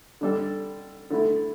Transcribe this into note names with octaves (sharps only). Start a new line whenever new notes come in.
D3 G3 D4 A4
D3 A3 E4